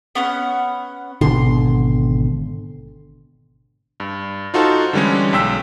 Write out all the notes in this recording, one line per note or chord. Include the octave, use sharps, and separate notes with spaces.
B3 C#4 F#5
G#1 B2 D3 C6
G2
D#4 F4 F#4 A4 C5
D3 E3 G3 G#3 C#4
B1 G5 E6 B6